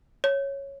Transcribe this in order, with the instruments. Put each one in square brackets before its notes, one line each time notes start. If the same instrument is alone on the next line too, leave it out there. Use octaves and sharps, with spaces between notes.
[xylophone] C#5